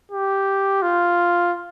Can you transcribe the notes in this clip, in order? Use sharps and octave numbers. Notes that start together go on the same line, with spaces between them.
G4
F4